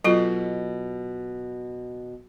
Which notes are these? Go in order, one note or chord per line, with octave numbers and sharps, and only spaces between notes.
B2 F#3 F4 A4